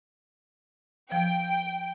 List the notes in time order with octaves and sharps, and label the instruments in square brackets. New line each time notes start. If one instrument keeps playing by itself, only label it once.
[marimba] F3 [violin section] G5